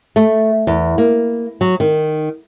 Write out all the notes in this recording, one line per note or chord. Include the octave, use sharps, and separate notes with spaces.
A3
E2
A#3
F#3
D#3